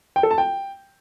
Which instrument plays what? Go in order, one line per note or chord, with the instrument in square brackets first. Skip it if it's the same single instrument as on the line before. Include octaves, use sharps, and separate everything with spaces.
[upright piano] G5
A4
A5
G5